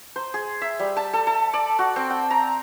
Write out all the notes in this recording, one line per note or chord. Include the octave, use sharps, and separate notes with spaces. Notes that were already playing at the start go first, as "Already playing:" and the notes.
C5
G#4
E5
G3
A5
A4
A4
D5
F#4
C4
G5
A#5